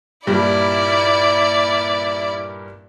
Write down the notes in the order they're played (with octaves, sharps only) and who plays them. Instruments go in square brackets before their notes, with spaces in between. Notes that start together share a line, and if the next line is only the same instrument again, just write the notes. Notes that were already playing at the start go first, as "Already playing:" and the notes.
[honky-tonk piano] G2 A#2 G3 [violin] E4 D5